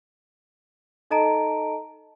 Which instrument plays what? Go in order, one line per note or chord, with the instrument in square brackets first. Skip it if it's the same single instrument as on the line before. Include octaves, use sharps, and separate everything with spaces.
[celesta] D#4 A4 D#5 A5 A#5 D7